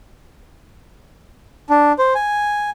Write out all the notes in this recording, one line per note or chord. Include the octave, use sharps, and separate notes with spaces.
D4
C5
G#5